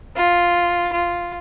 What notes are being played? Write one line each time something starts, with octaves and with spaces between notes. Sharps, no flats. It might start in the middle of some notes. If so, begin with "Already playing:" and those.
F4
F4